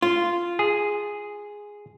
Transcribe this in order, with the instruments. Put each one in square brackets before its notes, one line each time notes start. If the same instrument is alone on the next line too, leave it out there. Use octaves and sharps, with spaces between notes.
[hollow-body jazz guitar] F4
[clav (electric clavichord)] G#4